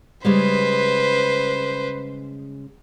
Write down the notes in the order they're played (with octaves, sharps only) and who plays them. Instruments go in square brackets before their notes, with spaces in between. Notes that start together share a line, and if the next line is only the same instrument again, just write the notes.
[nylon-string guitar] C#3 G3 G#3 [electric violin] B4 C5